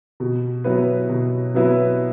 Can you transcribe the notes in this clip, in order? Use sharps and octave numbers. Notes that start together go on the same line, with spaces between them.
B2
F#3 B3 E4 B4
B2
F#3 B3 E4 B4